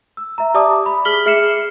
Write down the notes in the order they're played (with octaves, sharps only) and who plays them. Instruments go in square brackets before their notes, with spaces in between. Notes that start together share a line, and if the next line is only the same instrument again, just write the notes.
[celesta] E6
E5 A#5
G4 D5 E5 A5 D6 D#6
B5
G#4 F6 B6 F#7 G7
G#4 E5 F6 C7 C#7 E7